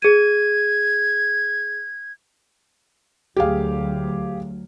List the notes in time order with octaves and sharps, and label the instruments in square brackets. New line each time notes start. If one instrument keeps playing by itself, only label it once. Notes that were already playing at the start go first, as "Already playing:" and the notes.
[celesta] G#4 D#7 [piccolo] G#6
[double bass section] D2 F#3 [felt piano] G4 G#4 F5